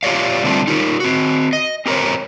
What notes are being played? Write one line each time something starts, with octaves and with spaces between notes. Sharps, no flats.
F4 G4 C#5 D5 F5
D3 G3 A3 C4 D4 F4
D#4 F4 G4 A#4
C4 F#4
D#5
C4 G4 A#4 C5 C#5